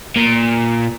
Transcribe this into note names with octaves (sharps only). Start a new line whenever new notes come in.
A#2